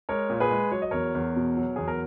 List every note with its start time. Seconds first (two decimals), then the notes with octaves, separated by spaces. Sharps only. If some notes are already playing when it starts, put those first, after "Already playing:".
0.09 G#3 A#4 C#5
0.30 A#2
0.40 G#4 B4
0.51 G#3
0.72 F#3 C#5
0.82 D#5
0.91 E2 A#4 C#5
1.15 E2
1.36 B2
1.57 F#3
1.76 E2 G#4
1.88 A#4